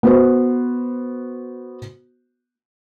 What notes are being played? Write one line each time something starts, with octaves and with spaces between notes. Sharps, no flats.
B3 F#4 C5